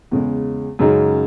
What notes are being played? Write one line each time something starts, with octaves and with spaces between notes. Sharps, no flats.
E2 C#3 G#3
F#2 C#3 G#3 D#4